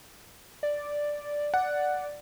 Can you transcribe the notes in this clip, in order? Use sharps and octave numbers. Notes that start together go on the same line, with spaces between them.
D5
F#5